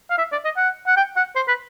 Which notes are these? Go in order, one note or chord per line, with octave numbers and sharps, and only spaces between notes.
F5
E5
D5
D#5
F#5
F#5
G5
F#5
C5
B4